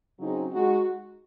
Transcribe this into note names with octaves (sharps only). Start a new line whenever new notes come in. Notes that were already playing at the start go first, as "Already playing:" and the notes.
C#3 F#3 C4 D#4 G#4
G#3 D#4 F#4